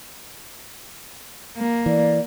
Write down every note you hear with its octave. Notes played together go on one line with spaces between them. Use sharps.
A#3
E3 D5